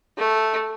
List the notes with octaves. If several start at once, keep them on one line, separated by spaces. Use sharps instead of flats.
A3